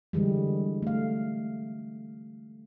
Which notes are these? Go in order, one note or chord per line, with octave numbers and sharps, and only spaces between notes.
D3 E3 G3 G#3
A3 F5